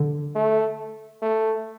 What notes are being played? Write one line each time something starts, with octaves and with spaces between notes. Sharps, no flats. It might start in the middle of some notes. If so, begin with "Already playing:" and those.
Already playing: D3
A3
A3